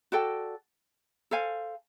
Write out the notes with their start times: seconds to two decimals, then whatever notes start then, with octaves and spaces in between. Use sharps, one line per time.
0.12 F#4 A4 D5 G5
1.31 A4 C5 F5 G#5